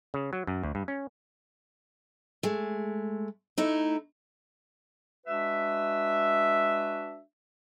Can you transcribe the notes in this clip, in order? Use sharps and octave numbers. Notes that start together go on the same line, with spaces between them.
C#3
F#3
F#2
D2
G2
C#4
G#3 A3
A3 D#4 E4
G#3 D4 F#4 B4 E5